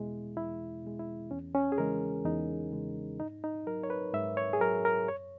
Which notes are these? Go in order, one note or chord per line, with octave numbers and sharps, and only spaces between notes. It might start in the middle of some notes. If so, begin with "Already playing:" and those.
Already playing: E2 B2 G#3 E4
E2 E4
B2 G#3
E4
E2 C#4
C#4
G#4
C#3 E3 G#3 A#4
E2 D#4
C#3 E3 G#3
G#2 D#4
D#4
F#3 A#4
C#5
B4
G#2 E5
C#5
G#4
F#3 A#4
A#4
F#2 C#5